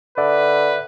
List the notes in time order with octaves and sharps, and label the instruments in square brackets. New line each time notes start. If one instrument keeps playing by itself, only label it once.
[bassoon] D3 [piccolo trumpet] B4 [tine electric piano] D5 E5